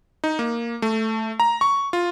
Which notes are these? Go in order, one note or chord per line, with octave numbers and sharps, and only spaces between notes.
D#4
A#3
A3
A#5
C#6
F4